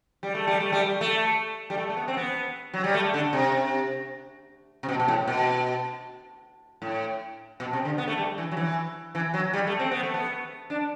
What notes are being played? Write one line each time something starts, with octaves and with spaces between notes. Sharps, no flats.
G3
A3
G3
A3
G3
A3
G3
A3
A3
B3
C4
B3
F#3
G3
A3
D3
C3
C3
B2
B2
A2
B2
A2
B2
C3
D3
B3
A3
G3
E3
F#3
E3
E3
F#3
G3
A3
C4
B3
A3
B3
D4